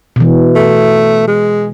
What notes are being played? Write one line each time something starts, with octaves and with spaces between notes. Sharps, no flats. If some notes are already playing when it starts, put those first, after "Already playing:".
B2 E3
A3
G#3